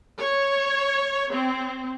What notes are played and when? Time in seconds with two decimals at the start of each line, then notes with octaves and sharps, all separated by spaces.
0.19 C#5
1.31 C4